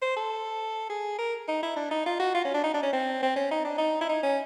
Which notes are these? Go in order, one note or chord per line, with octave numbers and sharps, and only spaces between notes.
C5
A4
G#4
A#4
D#4
E4
D4
D#4
F4
F#4
F4
C#4
D4
D#4
D4
C#4
C4
C4
C#4
D#4
D4
D#4
E4
D#4
C#4